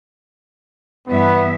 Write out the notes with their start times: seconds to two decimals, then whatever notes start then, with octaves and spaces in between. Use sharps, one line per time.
1.08 G2 E3 B3 E5